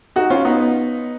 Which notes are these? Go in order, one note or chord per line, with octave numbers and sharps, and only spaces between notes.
D#4 F#4
C#4 F4
B3 D#4